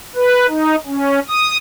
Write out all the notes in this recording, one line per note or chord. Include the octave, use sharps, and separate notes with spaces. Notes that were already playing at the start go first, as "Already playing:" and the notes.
B4
D#4
C#4
D#6